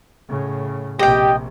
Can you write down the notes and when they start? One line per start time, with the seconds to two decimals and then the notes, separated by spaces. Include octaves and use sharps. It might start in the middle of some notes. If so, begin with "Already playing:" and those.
0.28 A2 C#3
0.99 A#1 C3 G4 D#5 G5